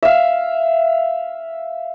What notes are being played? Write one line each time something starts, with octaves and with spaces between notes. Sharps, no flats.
E5 F5